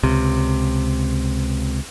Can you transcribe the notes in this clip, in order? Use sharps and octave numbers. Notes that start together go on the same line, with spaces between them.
C#2 C3